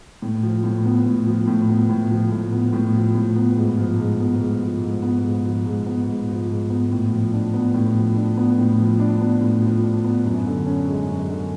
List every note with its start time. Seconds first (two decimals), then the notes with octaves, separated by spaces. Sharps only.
0.22 A2
0.43 F3
0.64 A2
0.85 B3
1.06 A2
1.26 F3
1.47 A2
1.69 B3
1.89 A2
2.10 F3
2.31 A2
2.52 B3
2.73 A2
2.94 F3
3.15 A2
3.36 B3
3.56 G#2
3.77 F3
3.99 G#2
4.19 B3
4.40 G#2
4.61 F3
4.81 G#2
5.02 B3
5.24 G#2
5.45 F3
5.66 G#2
5.86 B3
6.08 G#2
6.29 F3
6.49 G#2
6.70 B3
6.91 A2
7.11 F3
7.32 D4
7.54 B3
7.74 A2
7.95 F3
8.16 D4
8.37 B3
8.58 A2
8.79 F3
8.99 D4
9.21 B3
9.41 A2
9.62 F3
9.83 D4
10.04 B3
10.25 F#2
10.46 D3
10.67 C#4
10.88 G#3
11.08 F#2
11.30 D3